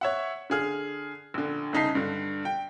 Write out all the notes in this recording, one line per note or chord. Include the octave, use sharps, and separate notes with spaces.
C#5 E5 F#5
D3 G#4 F6
A#1 D3
C2 C#3 D#4 A5 B6 C7
G2 D3
G5